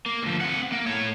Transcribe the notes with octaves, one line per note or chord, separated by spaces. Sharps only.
A#3
D2 F3
C4 F#5
A#3
A2 C#5